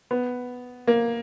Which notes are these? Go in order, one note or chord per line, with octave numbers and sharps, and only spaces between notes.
B3
A#3